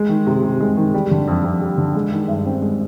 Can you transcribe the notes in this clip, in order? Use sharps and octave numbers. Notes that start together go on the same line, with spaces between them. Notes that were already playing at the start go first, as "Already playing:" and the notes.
Already playing: G#3
D#3
C3
C3
G#3
D#3
G3
D3
F2
F2
G3
D3
G#3
D#3
G2
C4
G#3